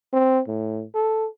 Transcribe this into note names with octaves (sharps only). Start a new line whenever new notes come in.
C4
A2
A4